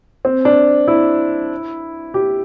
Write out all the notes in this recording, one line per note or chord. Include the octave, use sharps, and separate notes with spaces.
C4
D4
E4
G4